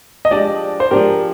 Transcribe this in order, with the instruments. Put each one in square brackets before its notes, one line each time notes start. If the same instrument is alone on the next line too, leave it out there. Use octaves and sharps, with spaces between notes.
[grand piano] D#5
[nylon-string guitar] F3 G#3 D4 G4 [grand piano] D5
[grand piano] C5
[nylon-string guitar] F3 G#3 D4 G4 [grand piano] A#4